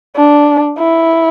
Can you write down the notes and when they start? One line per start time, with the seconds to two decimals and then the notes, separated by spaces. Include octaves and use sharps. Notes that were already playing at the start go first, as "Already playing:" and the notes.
0.16 D4
0.78 E4